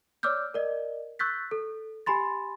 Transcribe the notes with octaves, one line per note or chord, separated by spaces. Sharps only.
C#5 D5 D6 E6 F6 G6
A#4 D5 D#5
C#6 E6 F#6 G6 A6 B6
A4
G4 G#5 B5 C6 A6